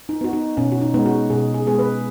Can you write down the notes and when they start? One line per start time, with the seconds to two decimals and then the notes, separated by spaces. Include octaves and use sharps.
0.09 D#4
0.21 B3 F#4
0.33 D#4
0.57 B2 C#4
0.72 F#4
0.81 D#4
0.94 G#3 B3 D#4
1.06 F#4
1.30 B2 G#4
1.54 G#4
1.67 G#3 B3 G#4
1.79 B4